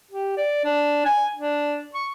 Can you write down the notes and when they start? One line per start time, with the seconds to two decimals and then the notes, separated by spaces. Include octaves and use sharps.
0.11 G4
0.37 D5
0.65 D4
1.05 G#5
1.36 D4
1.94 C#6